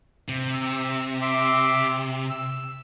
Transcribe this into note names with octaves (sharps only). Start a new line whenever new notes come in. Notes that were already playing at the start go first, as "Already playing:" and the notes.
C3
E6
E5 C6 D6
E6